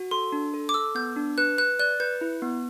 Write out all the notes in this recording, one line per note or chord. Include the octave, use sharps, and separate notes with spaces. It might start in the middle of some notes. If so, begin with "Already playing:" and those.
Already playing: F#4
A4 C6
D4
A4
D6
A4 E6
B3 G6
D4
B4 F#6
B4 F#6
D5 F#6
B4 G6
E4
B3